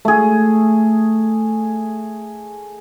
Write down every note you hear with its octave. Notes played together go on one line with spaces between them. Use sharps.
A3 G#4